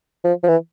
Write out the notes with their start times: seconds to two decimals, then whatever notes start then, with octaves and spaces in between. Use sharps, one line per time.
0.24 F3
0.43 F3
0.48 E3